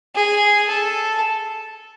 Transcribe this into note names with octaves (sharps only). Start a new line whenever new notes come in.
G#4
A4